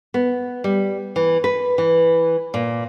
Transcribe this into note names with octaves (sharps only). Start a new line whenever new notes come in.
B3
G3
E3
B4
E3
A#2